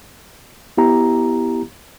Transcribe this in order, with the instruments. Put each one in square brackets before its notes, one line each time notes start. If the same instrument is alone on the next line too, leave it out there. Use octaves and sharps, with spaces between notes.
[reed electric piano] B3 E4 G4 A#5